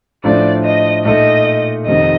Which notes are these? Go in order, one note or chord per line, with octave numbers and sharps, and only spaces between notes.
A2 F3 A3 D4 F4 D5
D#5
A#2 A3 D#4 A4 D#5
F1 F2 D#3 D#5